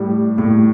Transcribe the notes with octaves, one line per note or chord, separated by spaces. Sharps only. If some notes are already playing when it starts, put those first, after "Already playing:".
Already playing: A2 G3
A2